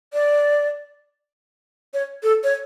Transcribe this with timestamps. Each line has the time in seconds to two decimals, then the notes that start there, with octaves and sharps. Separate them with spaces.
0.14 D5
1.94 C#5
2.23 A4
2.44 C#5